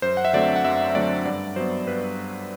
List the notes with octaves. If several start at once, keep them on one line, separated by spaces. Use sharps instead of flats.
F#2 C5
F#5
E5
D3 F#3 A3 C4 D5
F#5
F#2 E5
E5
D3 F#3 A3 C4 D5
G2 D5
F#3 B3 C5
G2 B4